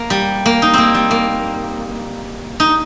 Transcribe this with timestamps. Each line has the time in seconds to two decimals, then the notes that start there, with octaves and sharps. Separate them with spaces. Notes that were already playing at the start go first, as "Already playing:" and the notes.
Already playing: A#3
0.10 G3
0.46 A#3
0.62 D#4
0.74 A#3 C4
0.95 G3
1.11 A#3
2.60 D#4